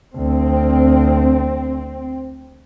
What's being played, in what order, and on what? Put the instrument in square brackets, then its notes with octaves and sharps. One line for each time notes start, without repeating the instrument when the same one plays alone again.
[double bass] D2 [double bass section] C4